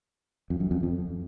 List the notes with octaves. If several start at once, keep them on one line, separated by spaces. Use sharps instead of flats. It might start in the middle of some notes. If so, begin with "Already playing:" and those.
F2
F#2
F2
F2